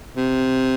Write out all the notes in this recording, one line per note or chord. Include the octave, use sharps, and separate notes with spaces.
C3